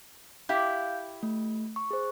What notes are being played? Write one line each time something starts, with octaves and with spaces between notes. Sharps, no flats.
E4 G4 F5 G6
A3
C#6
G#4 C5